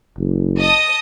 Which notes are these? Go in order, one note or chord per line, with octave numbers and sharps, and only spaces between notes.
F#1
D#5 A5 D#6